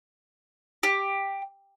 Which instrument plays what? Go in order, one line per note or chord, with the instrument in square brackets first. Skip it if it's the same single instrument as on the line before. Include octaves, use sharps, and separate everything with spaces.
[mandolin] G4